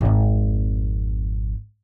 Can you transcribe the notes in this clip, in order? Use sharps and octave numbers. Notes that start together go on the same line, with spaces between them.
G#1 F2